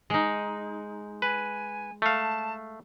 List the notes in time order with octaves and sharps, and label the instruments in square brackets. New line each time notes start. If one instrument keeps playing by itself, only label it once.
[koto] G#3 D#4
[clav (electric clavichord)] B4 [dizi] G#5
[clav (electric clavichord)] A3 F5 [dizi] A5